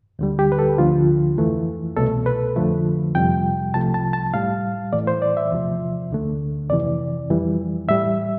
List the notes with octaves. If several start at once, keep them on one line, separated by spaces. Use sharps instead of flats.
D2 D3 G3
G4
B4
A4
D2 D3 F3 A3 F4
F2 E3 A3
C2 B2 A3 A4
B4
F2 D3 F3 A3
F2 C3 G3 G5
C2 C3 F3 A3 A5
A5
A5
A2 G3 F5
A2 E3 A3 D5
C5
D5
E5
E2 C3 F3
D2 D3 A3
F2 C3 E3 D5
F2 E3 G3
A2 G3 E5